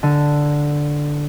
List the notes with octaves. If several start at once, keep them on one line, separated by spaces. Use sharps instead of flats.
D3